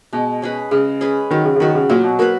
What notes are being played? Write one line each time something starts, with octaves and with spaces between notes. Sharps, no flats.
B2 G#3
C#4 G#4 B4
C#3 G#3
C#4 G#4 B4
D#3 F#3
C#3
C#3
D#3 B3 F#4 B4
C#3
A#2 F#3
B2
A#3 B3 F#4 B4